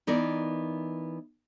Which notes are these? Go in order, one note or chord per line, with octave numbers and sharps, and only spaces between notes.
E3 B3 D#4 A#4 D5